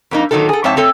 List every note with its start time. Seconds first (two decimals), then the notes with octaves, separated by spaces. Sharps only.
0.11 F2 A#3 D#4
0.31 A#2 D#3 F#3 G#3 D#4 A4
0.49 G#4 A4
0.64 G#2 F3 C4 C#5 E5 A5
0.76 A3 C4 A4 C#5